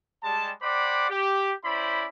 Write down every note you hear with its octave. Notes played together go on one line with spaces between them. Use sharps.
G3 G#3 A5
C5 D5 F#5 G5 B5 D6
G4
C#4 E4 C5 D5 B5